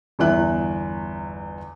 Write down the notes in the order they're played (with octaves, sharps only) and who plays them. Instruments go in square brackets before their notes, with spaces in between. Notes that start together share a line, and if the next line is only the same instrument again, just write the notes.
[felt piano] G1 E2 E4 F#6